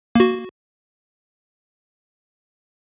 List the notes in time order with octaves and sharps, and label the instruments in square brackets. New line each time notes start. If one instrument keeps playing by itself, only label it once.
[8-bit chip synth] A#3 F#4